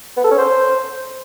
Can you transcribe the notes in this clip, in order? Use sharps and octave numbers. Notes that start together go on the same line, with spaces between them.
B3
A4
C#4
C5